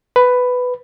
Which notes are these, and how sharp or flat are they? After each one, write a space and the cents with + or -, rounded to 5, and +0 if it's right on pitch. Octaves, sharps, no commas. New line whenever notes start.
B4 +10